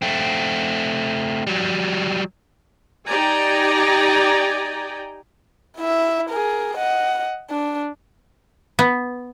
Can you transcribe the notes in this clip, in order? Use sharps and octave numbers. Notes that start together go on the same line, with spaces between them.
A3 C4
F#3 G3
D#4 G4 D5 G5 G#5 A#5
E4 E5
G#4 A#4
D#5 F#5
D4
B3